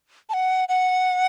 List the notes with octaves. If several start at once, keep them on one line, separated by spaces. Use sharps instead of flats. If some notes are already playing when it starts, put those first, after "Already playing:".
A5
F#5
F#5